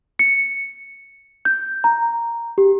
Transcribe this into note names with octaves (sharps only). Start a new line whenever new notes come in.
C#7
G6
A#5
G4